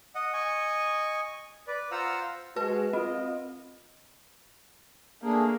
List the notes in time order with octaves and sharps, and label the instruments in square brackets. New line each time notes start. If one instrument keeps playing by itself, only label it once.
[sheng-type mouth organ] D#5 F#5
D#5 G#5 C#6
B4 D5
F4 C5 F5 F#5 A#5 E6
[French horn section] G#3 F#4 [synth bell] B4
[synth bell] C4 [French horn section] F4 D#5
[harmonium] A3 D4 G#4 [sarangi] A#3